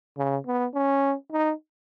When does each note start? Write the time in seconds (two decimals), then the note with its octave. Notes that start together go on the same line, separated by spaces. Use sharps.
0.17 C#3
0.46 B3
0.74 C#4
1.32 D#4